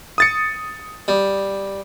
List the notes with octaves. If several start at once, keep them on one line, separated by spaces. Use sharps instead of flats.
D#6 A6 C#7
G3